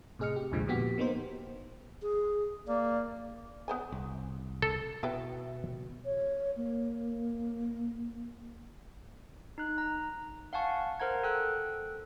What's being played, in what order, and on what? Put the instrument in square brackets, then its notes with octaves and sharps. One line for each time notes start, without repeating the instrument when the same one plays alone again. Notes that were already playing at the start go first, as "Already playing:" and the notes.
[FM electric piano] A2 C3 G#4 D#5 F6 C#7
G4
C2 F2 A#2 D3 F3 G#3
A#2 F3 B3 F#4 G4 B6
A#3 B3 D#4 C5
[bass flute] G#4
[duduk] A#3 [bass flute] D5
[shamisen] B3 C5 G#5
[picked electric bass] C2
[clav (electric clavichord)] A4
[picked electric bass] B2 [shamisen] E4 B4 G5
[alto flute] C#5
A#3
[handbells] D#4 F#6
A#5
F5 F#5 G#5 A5 C#6
A#4 C5 F#5 A#5 G#6
A4 G5 E6 F#6